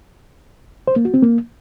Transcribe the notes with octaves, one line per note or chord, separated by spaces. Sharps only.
C5
A#3
F#4
C4
A#3